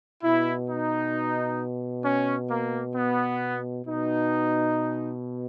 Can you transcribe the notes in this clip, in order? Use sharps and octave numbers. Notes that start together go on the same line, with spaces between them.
B2 E4
D#4
C#4
A#3
B3
B2 D#4